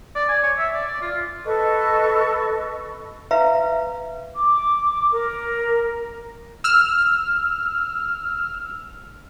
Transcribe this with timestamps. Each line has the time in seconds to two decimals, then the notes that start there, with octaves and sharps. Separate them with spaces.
0.15 D5
0.29 G#5
0.43 C#5
0.58 E5
0.73 D5
0.87 D5
1.02 F4
1.45 A4 B4 D#5 C#6
3.31 B4 E5 F5 A#5
4.36 D6
5.12 A#4
6.64 E6 F6